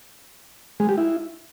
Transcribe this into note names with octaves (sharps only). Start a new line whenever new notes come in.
G#3
G4
E4